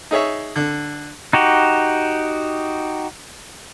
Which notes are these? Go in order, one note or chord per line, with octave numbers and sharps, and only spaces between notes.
D#4 G#4 C#5 E5
D3
D#4 F#4 G4